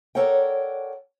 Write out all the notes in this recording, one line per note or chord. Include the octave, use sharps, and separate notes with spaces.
A4 A#4 C#5 D5 F#5 G5